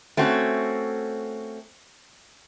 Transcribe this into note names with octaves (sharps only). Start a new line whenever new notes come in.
A3 C4 C#4 F#4